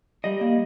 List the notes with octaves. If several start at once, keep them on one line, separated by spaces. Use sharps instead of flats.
G3 D#5
A#3